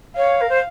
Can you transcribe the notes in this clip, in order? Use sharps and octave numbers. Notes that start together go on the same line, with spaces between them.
C#5 F5
A#4
C5